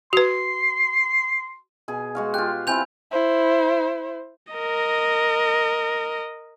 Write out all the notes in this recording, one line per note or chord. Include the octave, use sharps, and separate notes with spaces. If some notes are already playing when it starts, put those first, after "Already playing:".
F#4 B4 C6
B2 G#4
G#3 F#4 F5
F4 G4 F#6
C4 E4 F4 G#5 G6 F7
E4 C5
A#4 D#5